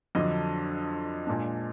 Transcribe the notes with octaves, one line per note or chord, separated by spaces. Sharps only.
F2 D3 F#3 D4 D#5
A#2 G#3 D4